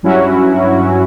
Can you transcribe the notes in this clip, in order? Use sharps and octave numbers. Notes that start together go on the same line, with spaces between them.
G2 F#3 C#4 E4 F#4